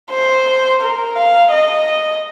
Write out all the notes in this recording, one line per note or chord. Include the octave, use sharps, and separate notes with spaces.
C5
A#4
F5
D#5